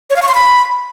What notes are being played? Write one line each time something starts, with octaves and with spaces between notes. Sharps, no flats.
C#5
F5
C#6
C6
B5